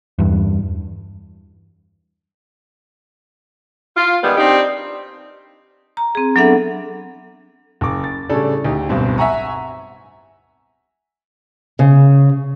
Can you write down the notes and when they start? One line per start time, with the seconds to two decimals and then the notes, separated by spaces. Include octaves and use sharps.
0.19 E2 G2
3.96 F4
4.23 D#3 G3 G#3 B3
4.37 C4 D4 D#4 G4
5.97 A#5
6.15 C4 G#4
6.36 F#3 B3 D4 A4 E5 F#5
7.81 F#1 D6
8.04 A6
8.29 A2 C#3 G3 C#4 D4 A4
8.64 D2 D#4 G4
8.89 D1 B1 G2 B2 C4
9.18 E5 F#5 G#5 A#5 C#6
11.79 C#3